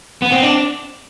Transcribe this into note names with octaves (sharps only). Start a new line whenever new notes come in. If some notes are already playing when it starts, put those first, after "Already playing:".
B3
C4
D4